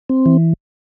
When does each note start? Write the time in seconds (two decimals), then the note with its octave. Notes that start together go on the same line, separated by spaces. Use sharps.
0.09 C4
0.26 E3